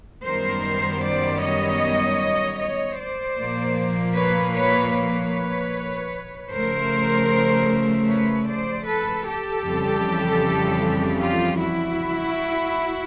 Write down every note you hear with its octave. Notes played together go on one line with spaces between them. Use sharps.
F#2 D#3 G3 B3 A#4 C5
C5 D5
C#5 D#5
C#5 D#5
C5 D5
A#2 F3 A#3
B4 C#5
B4 C#5
B4 C#5
C#3 F3 A3 A#4 C5
B4 C#5
C5 D5
A4 B4
G4 A4
F2 C#3 E3 G3
F4 G4
E4 F#4